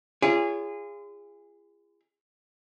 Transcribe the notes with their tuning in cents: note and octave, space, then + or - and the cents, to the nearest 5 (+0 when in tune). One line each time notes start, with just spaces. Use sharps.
F4 -40 G#4 -20 C#5 +30